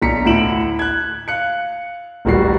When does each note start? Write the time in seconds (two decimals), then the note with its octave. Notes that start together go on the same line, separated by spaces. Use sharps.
0.02 B1 D4 A#5 B6 C#7
0.25 D2 A2 E4 D7 E7 F#7
0.79 F#6 G#6
1.28 F5 F#6 C#7
2.25 D1 A1 G3 F#4 A#4 C7